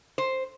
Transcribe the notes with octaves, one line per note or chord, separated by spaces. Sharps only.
C5